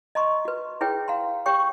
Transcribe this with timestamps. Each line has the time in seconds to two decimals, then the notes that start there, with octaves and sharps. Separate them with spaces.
0.15 D#5 A#5 C6 C#6
0.45 F#4 B4
0.81 E4 G#4 B4 C#5 G5
1.08 F5 A#5 C6
1.46 G4 C#5 G5 C#6